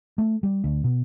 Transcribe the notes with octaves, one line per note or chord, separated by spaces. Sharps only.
A3
G3
D2
B2